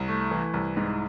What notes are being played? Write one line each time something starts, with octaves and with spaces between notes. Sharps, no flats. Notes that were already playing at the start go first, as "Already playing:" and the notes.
Already playing: C2
A3
E3
C2
G#2